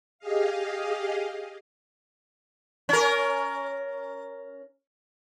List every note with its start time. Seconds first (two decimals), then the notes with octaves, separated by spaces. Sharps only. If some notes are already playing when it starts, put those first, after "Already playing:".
0.19 G4 G#4 D#5 F5
2.89 C#4 A#4